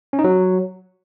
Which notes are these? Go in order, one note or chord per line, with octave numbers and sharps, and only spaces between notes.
C#4
D#4
F#3